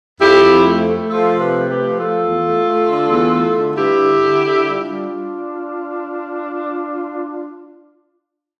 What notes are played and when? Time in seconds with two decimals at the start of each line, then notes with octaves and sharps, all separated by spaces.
0.20 F2 E4 G4
0.43 F2
0.66 A3
0.88 A3
1.09 F3 F4 A4
1.32 C3
1.39 G4 B4
1.55 A3
1.69 G4 B4
1.77 F3
1.99 A3 F4 A4
2.21 E2
2.43 A3
2.65 A3
2.88 D3
3.10 E2
3.33 A3
3.55 D3
3.77 G2 E4 G4
3.99 D3
4.21 D3
4.44 D3
4.66 G3 D4 F4
4.88 G3